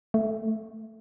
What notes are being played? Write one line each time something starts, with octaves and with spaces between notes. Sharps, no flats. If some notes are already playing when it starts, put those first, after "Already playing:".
A3